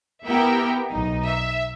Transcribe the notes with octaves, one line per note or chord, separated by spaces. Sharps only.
B3 E4 G4 A#4 E5 G5
B1 D#4
E5